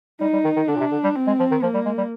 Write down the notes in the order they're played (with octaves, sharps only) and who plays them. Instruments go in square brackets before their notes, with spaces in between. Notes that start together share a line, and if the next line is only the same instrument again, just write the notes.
[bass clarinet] G3 [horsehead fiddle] D#4
[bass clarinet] G3
D#3
D#3
[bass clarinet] D3 [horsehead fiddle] D4
[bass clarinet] A#2
C3
D3
G3
[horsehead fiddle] C4
[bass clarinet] G#3
F3
D#3
[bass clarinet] F3 [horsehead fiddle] A#3
[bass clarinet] G3
G#3
G3